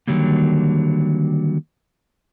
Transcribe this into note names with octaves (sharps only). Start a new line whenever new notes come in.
D3 D#3 F#3 G3 A#3